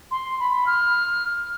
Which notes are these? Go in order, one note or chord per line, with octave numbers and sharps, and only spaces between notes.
C6
B5
F6